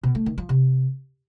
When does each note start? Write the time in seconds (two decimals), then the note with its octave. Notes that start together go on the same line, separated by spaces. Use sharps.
0.03 B2
0.15 A3
0.26 D#3
0.38 F3
0.49 C3